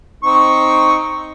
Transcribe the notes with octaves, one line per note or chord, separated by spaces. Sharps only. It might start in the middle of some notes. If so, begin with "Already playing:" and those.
C4 D#4 C#6